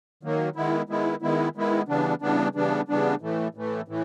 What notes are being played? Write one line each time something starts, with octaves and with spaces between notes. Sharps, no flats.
D#3 F#3 A#3
D#3 G#3 B3 E4
D#3 G#3 B3 E4
D#3 G#3 B3 E4
D#3 G#3 B3 E4
C#3 E3 G3 B3 D4
C#3 E3 G3 B3 D4
C#3 E3 G3 B3 D4
C#3 E3 G3 B3 D4
A2 E3 A3
A2 E3 A3
A2 E3